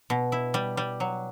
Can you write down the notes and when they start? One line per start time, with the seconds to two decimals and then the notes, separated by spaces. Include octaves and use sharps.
0.10 B2
0.32 E4
0.54 G3
0.77 G3
1.00 F#3